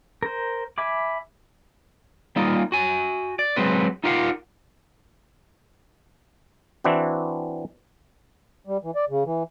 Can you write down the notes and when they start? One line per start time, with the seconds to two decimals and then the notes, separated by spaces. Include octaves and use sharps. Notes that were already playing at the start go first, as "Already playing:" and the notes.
0.23 A#4 C5
0.78 E5 G#5 B5 D6
2.36 G3 A#3 D#4 F4
2.72 F#4 G#5
3.39 D5
3.56 F#3 G#3 C4 B4
4.04 D#4 F4 G4 A#4 F5 F#5
6.84 E3 C4 D4 E4 F#4
8.67 G3
8.84 E3
8.95 D5
9.10 C#3
9.26 E3